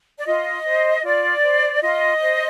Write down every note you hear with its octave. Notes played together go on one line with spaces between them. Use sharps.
D5
F4 D#5
C5
F4 D5
C5
F4 D#5
C5